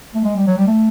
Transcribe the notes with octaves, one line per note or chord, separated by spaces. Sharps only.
A3
G#3
G3
F#3
G3
A3